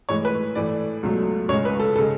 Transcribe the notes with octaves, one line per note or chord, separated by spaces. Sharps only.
A2 E3 G#3 C#5
B4
A2 E3 A3 D5
C#2 B2 F#3 A3
C#2 C#3 G#3 C#5
B4
A4
A4
C#3 G#3